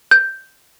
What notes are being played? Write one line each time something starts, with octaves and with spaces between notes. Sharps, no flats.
G6